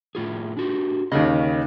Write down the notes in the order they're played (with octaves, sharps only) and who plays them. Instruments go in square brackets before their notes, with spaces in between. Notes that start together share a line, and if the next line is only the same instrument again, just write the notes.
[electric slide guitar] A2 F4 G#4
D4 F#4 G4
[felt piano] D#2 C#3 [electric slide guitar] A#4 D#5